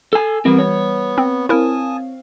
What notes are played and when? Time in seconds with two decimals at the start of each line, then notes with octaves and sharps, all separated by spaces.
0.13 A4 G#5 E6
0.45 E3 G3 B3 C4 A#4
0.59 C#5
1.18 C4
1.49 C4 E4 A#4 F5 G#5 A5 D#6